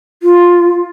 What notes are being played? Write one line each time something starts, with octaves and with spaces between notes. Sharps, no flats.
F4